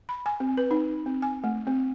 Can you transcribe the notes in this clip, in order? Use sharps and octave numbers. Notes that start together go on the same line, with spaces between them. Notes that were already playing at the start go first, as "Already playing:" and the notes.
B5
G#5
C4
B4
D#4
C4
G#5
A3
C4